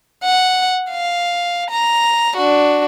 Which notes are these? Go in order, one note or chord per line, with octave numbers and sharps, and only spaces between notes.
F#5
F5
A#5
D4 F#4